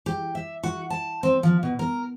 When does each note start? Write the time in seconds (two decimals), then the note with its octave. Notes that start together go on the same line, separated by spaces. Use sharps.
0.06 G4
0.35 E5
0.63 F#4
0.90 A5
1.23 C4
1.43 F3
1.63 B2
1.79 A#4